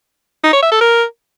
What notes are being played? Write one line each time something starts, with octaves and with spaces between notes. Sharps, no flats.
D#4
C#5
E5
A4
A#4